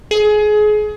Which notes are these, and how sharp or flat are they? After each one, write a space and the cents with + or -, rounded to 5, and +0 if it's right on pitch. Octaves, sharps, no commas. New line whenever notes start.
G#4 +25